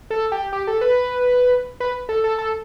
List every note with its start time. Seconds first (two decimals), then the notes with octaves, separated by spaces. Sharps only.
0.10 A4
0.32 G4
0.53 G4
0.67 A4
0.81 B4
1.80 B4
2.09 A4
2.24 A4
2.38 A4